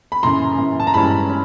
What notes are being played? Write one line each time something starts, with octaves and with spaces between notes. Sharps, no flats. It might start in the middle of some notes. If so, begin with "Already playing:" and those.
B5
F#2 C#3 E3 A#5 C6
F#2 C#3 E3
A5
A#5
G2 E3 G#3 C#4 A5 B5
C#4